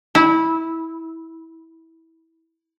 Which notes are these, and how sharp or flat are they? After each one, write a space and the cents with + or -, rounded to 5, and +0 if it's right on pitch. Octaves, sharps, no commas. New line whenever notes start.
E4 -20